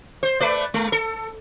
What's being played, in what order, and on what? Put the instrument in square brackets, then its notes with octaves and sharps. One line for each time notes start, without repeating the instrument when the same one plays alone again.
[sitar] C5
A3 B4 D5
G#3
A4